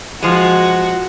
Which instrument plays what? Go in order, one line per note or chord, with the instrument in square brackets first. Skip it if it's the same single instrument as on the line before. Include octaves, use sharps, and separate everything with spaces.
[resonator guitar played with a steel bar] F3 G#3 [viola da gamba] F#4